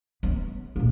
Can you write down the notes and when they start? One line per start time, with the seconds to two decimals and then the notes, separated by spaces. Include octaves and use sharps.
0.23 B3
0.76 A#2 A#3